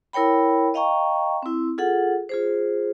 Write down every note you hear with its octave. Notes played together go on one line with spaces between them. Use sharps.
E4 A#4 C#5 G5 B5
D#5 F5 G5 A#5 C#6
C4 E4
F4 G#4 A4 F#5
F4 G#4 C5